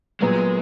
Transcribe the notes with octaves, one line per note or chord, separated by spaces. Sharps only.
A#2 F#3 G#3 B3